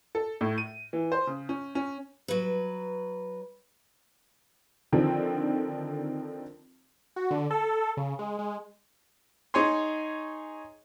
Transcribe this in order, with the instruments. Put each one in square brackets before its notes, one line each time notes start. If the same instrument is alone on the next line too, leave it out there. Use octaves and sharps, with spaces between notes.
[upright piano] A4
A2
D#7
E3
C5
C#3
C#4
C#4
[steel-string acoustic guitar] F#3 B4
[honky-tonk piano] D3 D#3 F3 C4
[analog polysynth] F#4
D3
A4
C#3
G#3
G#3
[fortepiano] D#4 G#4 C#5 G#5 C6